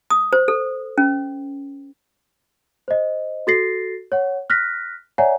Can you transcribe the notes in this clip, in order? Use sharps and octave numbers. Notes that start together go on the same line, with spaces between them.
D#6
C5
A4
C#4
C5 D#5
F#4 A4 A6 A#6 C7
C#5 F#5
F6 F#6 A#6 B6
C#5 D5 E5 F#5 G#5 A#5